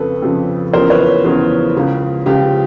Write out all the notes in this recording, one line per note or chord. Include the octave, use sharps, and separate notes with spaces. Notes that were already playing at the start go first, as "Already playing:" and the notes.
Already playing: F2 C#3 F3 A4 B4
F2 C#3 F3
E2 C#3 F3 A#4 C5
B4 C#5
E2 C#3 F3
C#2 C#3 F3
C#2 C#3 F3 F4 G4